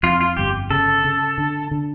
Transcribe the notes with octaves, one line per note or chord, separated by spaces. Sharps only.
F2 F4
F4
G1 G4
C#3 A4
C#3
D3
D3